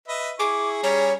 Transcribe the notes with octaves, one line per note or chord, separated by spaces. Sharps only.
B4 D#5 E5
E4 G#4 C#6 D6
G3 C#4 C#5 A#5